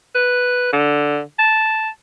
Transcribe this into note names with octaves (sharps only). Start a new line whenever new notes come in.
B4
D3
A5